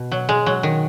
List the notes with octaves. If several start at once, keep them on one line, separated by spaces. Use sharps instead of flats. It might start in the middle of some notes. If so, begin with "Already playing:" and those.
Already playing: B2
F#3
G#3
F#3
D#3